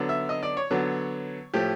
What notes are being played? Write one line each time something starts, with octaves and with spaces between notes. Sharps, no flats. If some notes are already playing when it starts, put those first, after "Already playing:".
Already playing: D3 F#3 B3
E5
D#5
D5
C#5
D3 F#3 B3
A2 F3 A3 G4